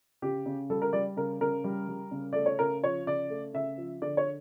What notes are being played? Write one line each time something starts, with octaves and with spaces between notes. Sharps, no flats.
C#3 G4
C#3
G3 A4
A#4
G3 D5
C#3 A#4
C#3 A#4
G3
G3
C#3
A3 D5
C#5
C#3 A#4
F3 C#5
C#3 D5
A3
C#3 E5
F3
D3 D5
C#5